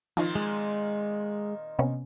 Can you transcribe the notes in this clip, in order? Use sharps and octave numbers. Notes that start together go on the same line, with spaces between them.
A#2 D#3 F3 C4 D#4
G#3
C3 B3 C#4